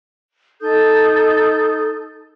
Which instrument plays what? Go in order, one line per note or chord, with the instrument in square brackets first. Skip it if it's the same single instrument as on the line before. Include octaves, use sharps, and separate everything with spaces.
[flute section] D#4 A4 D#6 G6